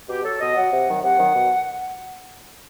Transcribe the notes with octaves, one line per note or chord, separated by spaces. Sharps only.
B2 G4
F#3 A4
B2 D#5
F#3 F#5
C3
D#3 F#3
C3 F#5
D#3 F#3
B2